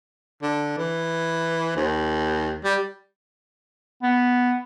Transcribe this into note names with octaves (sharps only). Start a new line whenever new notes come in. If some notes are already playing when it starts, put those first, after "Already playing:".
D3
E3
D#2
G3
B3